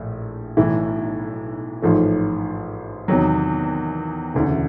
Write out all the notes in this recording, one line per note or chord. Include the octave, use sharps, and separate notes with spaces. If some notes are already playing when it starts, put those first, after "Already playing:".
Already playing: A#1 A2
B1 A2 E3
A1 G#2 F3 A3
E2 C3 D#3 F#3
E1 D2 C#3 E3